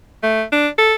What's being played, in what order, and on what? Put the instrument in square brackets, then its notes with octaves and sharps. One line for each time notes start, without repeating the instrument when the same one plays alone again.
[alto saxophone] A3
D4
A4